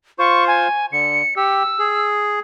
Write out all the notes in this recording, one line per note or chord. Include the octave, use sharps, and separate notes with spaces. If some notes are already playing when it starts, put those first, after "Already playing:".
F4 C5 C#6
G#5
D3 C#7
G4 E6
G#4